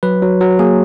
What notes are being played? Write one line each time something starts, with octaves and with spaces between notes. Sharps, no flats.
F#3 B4
F#3
F#3
A#3 G#4